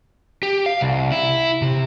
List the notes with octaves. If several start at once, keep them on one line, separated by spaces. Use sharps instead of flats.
G4
F5
C2
E4
C3